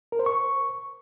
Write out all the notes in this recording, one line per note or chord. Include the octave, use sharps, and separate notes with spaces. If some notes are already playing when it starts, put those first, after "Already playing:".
A#4
C5
C#6